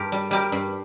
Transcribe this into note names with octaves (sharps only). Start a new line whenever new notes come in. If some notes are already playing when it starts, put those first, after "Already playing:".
Already playing: G2 G4 A#4
G3
G3 G4 A#4
G2